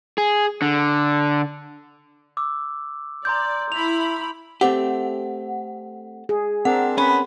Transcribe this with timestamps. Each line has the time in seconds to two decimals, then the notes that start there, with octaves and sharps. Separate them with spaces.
0.18 G#4
0.62 D3
2.37 D6 E6
3.25 D5 A#5 C6 G6
3.72 E4 B5 F7
4.61 A3 C4 G4 F#5
6.29 G#4
6.65 C4 D4 A#4 F#5
6.98 B3 C#4 B5